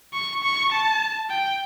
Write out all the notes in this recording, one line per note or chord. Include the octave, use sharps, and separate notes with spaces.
C#6
C#6
A5
G5